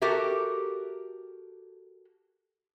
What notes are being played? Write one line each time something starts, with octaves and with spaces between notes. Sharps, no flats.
F#4 G4 A4 A#4 E5